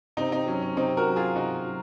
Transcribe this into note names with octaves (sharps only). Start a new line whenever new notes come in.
C3 C4 D#4
C4 D#4
F#3 C#4
C#4
C3 C4 D#4
F#4 A#4
F#3
F4 G#4
C3 D#4 F#4
F#3